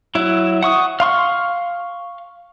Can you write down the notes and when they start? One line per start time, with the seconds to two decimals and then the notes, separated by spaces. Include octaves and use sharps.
0.15 F#3 E4
0.63 F#5 C#6 D#6
1.00 F5 C6 C#6